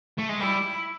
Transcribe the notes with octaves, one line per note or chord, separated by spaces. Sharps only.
A3
G#3
G3 E4